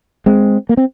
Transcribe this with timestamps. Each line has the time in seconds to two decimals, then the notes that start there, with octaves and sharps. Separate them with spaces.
0.26 G#3 C4
0.69 A#3
0.77 C4